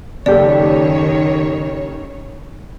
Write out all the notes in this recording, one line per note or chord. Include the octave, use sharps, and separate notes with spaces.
F#1 D#3 G4 A4 C#5 D5